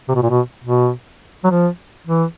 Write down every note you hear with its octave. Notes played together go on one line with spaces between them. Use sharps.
C3
B2
A#2
B2
B2
F#3
F3
E3